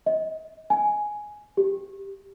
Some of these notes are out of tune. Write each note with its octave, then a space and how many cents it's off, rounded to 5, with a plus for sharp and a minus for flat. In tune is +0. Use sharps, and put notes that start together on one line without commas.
D#5 +30
G#5 +5
G4 +0